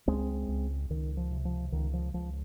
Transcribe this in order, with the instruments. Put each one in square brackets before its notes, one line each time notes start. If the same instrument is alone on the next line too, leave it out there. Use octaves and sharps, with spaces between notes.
[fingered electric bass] C#2 G#3 C4
C#2
C#2 D#3
F3
C3
F3
C#2 D#3
F3
C#2 F3